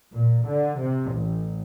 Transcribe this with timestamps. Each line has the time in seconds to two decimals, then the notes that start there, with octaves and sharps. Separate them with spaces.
0.14 A#2
0.46 D3
0.80 C3
1.14 A1